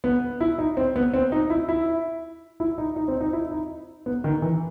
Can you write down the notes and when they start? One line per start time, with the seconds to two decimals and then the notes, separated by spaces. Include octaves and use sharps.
0.04 B3
0.41 E4
0.58 D#4
0.77 C4
0.96 B3
1.14 C4
1.32 D#4
1.50 E4
1.69 E4
2.60 E4
2.78 D#4
2.96 D#4
3.08 C4
3.21 D#4
3.33 E4
3.51 D#4
4.06 B3
4.24 D#3
4.42 E3